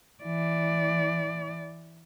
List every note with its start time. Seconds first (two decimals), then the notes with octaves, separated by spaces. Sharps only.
0.24 E3 D5